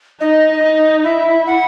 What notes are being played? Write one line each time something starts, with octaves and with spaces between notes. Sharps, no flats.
D#4 D#5
D#4
E4 E5
F#5